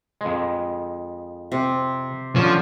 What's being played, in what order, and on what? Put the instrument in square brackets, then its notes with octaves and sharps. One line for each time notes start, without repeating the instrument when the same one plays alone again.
[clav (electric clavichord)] F2 G#3
[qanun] C3
[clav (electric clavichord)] D3 C#4 [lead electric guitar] F3